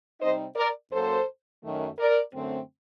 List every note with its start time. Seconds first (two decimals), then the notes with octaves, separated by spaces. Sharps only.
0.20 C3 G3 C4 D#4 C5 D#5
0.55 A#4 D5
0.91 F#2 F#3 A#3 A4 C5
1.63 F#2 D#3 A3
1.98 A#4 D5
2.33 F#2 D3 A3 C4